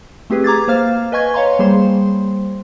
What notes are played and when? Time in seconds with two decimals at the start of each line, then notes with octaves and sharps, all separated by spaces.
0.30 A3 C4 G4 G#4 B4
0.44 A#5 D6 G#6 A6
0.68 A#3 C5 F5 F6
1.12 B4 D#5 G#5 C#6 G#6
1.34 C#5 F5 A#5 C6
1.59 G3 A#3 G#4 C5 C6